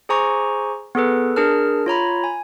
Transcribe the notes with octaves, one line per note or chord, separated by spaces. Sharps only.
G#4 C5 G#5 A#5 C#6 D6
B3 G#4 A4 B4
D4 G#4 A#4 A5 F6
F4 C#5 A#5 B5
G#5